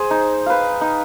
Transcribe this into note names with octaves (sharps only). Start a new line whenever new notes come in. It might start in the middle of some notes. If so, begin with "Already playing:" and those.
Already playing: G#4 C5
D#4
B4 F5
D#4